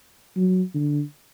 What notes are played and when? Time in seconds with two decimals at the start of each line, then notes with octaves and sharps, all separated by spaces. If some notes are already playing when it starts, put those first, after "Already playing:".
0.36 F#3
0.75 D3